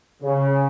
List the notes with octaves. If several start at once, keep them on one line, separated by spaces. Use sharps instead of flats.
C#3